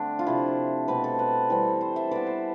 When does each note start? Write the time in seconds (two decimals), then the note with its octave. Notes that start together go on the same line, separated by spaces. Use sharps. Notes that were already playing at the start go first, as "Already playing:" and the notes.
Already playing: D3 A3 C4 D4
0.19 F4
0.27 C3 F3 A3 E4
0.88 B2 A3 C4 B4
1.04 A4
1.19 B4
1.50 E3 G3 C4
1.81 C5
1.96 E5
2.11 E3 B3 D5
2.27 C5